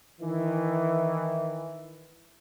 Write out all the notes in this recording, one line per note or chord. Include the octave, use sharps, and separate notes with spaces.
D#3 E3